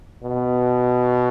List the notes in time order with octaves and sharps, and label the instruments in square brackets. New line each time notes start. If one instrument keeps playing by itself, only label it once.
[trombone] B2